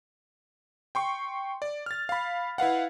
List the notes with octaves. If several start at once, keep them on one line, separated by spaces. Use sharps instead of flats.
G5 C6 C#6
D5
F6 A6
F5 B5
E4 B4 F5 F#5